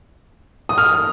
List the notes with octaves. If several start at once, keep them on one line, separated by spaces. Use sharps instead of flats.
D#6
F6